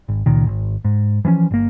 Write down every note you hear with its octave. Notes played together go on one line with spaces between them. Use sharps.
G#1
C#2 A#2 D#3
G#1
G#2
E3 F3 B3 C#4
G1 A#3